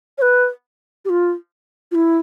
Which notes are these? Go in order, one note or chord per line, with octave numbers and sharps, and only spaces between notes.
C#5
B4
G4
F4
F4
E4